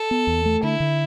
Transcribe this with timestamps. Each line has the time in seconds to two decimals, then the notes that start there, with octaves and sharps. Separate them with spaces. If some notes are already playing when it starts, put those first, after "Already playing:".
Already playing: A4
0.11 B3
0.27 E2
0.46 A3
0.63 D3 E4
0.80 D3